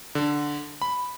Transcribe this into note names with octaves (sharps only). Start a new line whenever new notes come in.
D3
B5